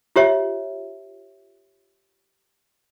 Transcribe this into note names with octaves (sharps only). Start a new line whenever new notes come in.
F4 G4 C#5 E5